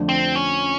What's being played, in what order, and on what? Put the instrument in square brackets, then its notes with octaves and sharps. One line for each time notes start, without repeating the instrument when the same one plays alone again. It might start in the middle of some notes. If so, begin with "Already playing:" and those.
Already playing: [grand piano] F2 D3 F3 A3 D4
[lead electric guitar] C4
C#4